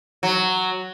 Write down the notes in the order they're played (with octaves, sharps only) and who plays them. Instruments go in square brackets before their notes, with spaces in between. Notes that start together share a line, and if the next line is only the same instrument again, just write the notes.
[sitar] F#3